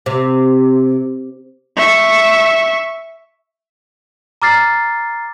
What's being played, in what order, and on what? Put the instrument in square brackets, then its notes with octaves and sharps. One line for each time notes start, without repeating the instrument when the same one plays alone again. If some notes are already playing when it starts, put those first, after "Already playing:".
[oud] C3
[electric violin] E5 C#6
[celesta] A#5 D6 F6 A6 C7